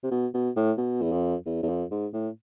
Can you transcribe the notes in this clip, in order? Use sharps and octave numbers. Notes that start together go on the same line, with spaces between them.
C3
B2
B2
A2
B2
E2
F2
E2
E2
F2
G#2
A2